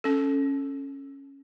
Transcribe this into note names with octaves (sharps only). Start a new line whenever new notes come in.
C#4 A4